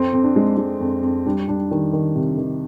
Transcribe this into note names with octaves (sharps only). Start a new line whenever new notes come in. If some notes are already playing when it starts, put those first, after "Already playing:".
Already playing: F2 C4
F2
D4
G#3
G#3
F2
F2
G3 D4
G3 D4
D#3 G3 D#4
D#3
C3
D#3